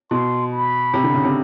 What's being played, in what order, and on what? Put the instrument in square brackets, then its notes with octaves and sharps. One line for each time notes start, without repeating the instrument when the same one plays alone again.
[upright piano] B2 [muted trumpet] C6
[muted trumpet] B5
[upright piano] C3
D3
C#3
C3